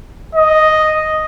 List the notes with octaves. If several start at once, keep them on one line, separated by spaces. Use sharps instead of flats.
D#5